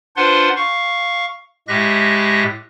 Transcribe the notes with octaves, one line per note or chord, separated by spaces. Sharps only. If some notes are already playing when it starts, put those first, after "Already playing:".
D4 F4 B4 C5 F#5 C6
F5 C#6
A2 G#3 G4 E5 F#6 A#6